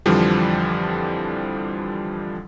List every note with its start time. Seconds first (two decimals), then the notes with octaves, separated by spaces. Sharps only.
0.06 F2 D3 E3 F3 G3